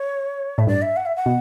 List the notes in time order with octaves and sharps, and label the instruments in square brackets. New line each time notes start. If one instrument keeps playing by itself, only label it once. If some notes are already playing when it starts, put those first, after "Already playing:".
Already playing: [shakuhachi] C#5
[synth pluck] A2 [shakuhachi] E5
[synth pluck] G2 [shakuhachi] D5
[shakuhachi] E5
F#5
E5
F#5
[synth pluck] B2